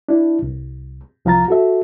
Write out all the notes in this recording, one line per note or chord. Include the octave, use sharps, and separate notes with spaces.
D4 E4
C2
C2 F3 F5 A#5 A6
F#4 A4 E5